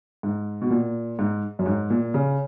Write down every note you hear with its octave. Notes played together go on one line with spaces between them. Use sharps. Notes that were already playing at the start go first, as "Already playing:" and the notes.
G#2
B2
A#2
G#2
F#2
G#2
A#2
C#3